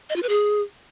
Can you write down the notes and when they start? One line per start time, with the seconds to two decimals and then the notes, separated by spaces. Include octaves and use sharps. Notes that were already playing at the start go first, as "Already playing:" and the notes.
0.09 D#5
0.16 F4
0.23 B4
0.29 G#4